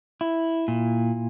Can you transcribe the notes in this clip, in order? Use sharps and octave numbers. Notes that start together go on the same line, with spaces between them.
E4
A#2